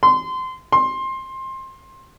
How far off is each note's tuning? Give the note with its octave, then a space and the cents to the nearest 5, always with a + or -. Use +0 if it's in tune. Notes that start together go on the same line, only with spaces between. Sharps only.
C6 -25
C6 +20